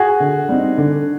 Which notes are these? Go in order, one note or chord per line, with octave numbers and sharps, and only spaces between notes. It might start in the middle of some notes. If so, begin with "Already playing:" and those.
Already playing: F#4 G#4
D3
G3 C4 D#4
D3